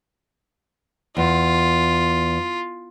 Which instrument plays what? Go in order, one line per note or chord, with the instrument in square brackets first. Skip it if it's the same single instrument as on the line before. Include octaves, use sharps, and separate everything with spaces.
[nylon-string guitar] E2 [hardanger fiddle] F4